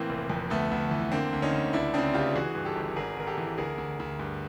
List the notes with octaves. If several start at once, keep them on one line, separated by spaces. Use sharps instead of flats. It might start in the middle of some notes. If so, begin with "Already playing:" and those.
Already playing: A2 E3 A#3 C4
F1
F2
D2 A3 B3
D2
E3
D3 A#3 C4
D2
C#4 D#4
D2
C#2 D4 E4
C#3 C4 D4
C#2 F4 G4
E3 F#4 G#4
G2
G4 A4
G1
G#1 G#4 A#4
G#1 A#4
G4 A4
E3
D2 G#4 A#4
D2
D2
G2